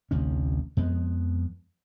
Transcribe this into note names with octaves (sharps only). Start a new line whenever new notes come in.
A1 D2 C3 C#4
F2 F3 G#3 B3